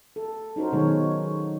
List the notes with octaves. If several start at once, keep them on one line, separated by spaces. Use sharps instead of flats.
A4
C#4 D#4 F#4 A#4 C5
B2 D#3 F#3 G#3 C#5